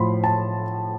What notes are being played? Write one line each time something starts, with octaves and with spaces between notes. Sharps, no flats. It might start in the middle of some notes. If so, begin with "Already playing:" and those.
Already playing: A2 F3 B5 C6
A5